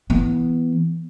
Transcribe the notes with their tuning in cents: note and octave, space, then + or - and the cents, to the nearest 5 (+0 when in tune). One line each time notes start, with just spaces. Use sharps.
E3 +0 B3 +0